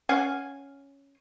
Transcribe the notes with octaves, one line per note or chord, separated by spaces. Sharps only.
C#4 F5 F#5 G#5